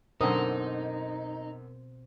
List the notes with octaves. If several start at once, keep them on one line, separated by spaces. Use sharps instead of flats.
F#2 B2 D3 C4 D#4 A#4 C5 D#6